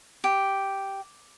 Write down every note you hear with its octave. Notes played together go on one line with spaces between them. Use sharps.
G4